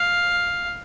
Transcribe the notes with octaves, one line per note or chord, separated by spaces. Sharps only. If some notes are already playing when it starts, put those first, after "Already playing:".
Already playing: F5